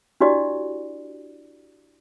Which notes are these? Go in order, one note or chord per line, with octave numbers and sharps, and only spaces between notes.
D4 E4 F#4 G4 D5 D#5